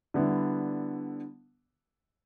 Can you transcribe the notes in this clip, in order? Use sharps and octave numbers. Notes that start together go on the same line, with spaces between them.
D3 G3 B3 E4